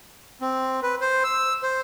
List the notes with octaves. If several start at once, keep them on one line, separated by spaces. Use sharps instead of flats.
C4
B4
C5
E6
C5